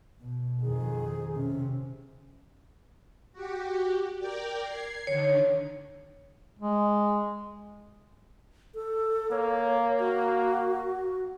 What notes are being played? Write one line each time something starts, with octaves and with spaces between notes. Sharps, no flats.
B2
F2 D#3 G#4
C3 C#4
F#4 G4
A#4 D5 G5
G#6 C7
D3 D#3 C#5
G#3
A4
A#3 C#5
F#4